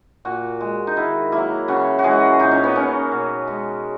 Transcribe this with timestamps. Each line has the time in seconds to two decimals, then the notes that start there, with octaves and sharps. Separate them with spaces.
0.25 A#2 F#4
0.61 G#3
0.87 D#4
0.97 D#3 E4
1.32 F#3 A#3 E4
1.68 C#3 F#4
1.99 F#4
2.04 E3 G#3 G#4
2.39 A#2 D#4
2.52 C#4
2.64 B3
2.76 A#3 C#4
3.12 B2
3.48 G#3